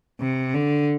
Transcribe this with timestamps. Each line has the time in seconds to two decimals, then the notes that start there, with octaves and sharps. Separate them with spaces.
0.20 C3
0.54 D3